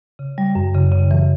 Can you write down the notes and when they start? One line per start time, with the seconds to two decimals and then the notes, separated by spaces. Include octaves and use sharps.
0.19 C#3
0.38 G3
0.55 F#2
0.74 C#3
0.92 C#3
1.11 E3